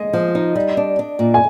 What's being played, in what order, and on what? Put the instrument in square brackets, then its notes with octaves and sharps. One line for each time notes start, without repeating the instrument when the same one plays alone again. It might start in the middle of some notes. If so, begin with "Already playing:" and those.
Already playing: [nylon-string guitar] G#3 [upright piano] D#5
[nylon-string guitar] F3
D#4
G3
D4
D4
A#2
[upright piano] G#5